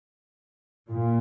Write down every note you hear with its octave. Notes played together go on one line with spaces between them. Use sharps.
A#2